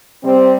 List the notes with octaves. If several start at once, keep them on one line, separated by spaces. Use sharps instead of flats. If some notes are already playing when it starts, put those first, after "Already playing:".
C3 G3 C4